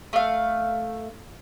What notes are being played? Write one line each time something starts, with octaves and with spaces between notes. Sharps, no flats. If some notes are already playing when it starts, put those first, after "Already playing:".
A3 F5